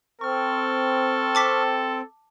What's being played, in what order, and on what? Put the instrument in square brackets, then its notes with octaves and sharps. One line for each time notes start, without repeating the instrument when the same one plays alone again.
[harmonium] C4 [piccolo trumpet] A4 [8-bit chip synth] C#6 F6
[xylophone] A5 D6 B6